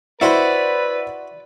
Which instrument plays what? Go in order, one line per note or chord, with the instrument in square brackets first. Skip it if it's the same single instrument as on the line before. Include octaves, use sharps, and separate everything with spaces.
[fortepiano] E4 F#5 [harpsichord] F#4 C5 D#5 [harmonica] B4 [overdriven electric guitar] D5